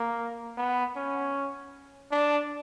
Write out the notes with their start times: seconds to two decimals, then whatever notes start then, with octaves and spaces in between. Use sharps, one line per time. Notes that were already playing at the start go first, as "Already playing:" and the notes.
Already playing: A#3
0.57 B3
0.96 C#4
2.11 D4